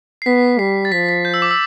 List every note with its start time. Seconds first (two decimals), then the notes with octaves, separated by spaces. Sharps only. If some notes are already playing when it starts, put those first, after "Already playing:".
0.22 C7
0.26 B3 B6
0.59 G3 C7
0.85 A6
0.92 F3 B6
1.09 B6
1.25 G6
1.34 E6
1.42 D6
1.51 E6